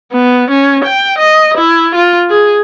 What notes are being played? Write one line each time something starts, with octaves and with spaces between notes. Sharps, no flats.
B3
C#4
G5
D#5
E4
F4
G#4